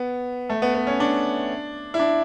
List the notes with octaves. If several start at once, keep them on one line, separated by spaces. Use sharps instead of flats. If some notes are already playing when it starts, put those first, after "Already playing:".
Already playing: B3
A3
B3
B3
C#4
D4
E4
D4